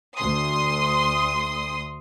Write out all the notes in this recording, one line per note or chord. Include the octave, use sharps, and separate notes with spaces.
D2 C6 D#6